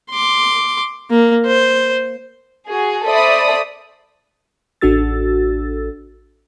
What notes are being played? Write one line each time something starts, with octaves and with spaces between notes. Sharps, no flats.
C6 D6
A#3
C5
F#4 G#4
A4 C5 D5 E5 B5 D#6
A1 D4 F#4 A4 E6 A6